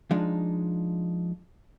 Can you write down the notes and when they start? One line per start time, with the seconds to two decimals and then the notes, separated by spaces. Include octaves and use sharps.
0.11 F3 G#3 D4 D#4